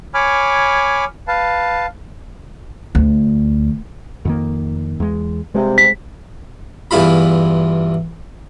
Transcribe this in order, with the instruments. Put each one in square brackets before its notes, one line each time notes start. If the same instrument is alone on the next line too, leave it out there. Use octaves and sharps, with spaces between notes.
[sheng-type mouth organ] C#5 G#5 B5 D6 F6
B4 F5 A5
[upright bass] D2
[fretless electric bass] F2 D#3 A#3
E2 G#3
[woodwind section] G2 C3 [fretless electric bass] G#3
[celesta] B6
[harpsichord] E2 G2 E4 F4 B5